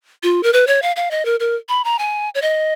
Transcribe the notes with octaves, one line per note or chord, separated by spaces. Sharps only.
F4
A#4
B4
C#5
F5
F5
D#5
A#4
A#4
B5
A#5
G#5
C#5
D#5